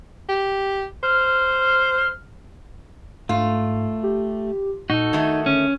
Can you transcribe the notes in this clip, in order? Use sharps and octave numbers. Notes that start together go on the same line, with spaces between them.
G4
C5 F6
G#2 A3 F4
G4
A#2 D#4 F#4 A4
D#3 A3 G#6
D3 C#4